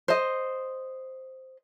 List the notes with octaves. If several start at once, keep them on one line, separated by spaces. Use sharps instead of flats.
C5 D#5